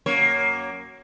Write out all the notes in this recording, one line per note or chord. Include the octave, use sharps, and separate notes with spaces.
F#2 A#3 C#5